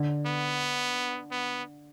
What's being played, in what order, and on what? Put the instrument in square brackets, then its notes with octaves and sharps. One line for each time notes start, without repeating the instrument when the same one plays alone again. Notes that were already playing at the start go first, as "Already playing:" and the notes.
Already playing: [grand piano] D3
[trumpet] B3
B3